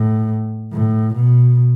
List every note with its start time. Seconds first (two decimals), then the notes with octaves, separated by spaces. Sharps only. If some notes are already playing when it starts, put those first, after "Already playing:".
Already playing: A2
0.72 A2
1.15 B2